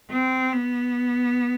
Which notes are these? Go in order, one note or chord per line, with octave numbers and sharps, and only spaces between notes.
C4
B3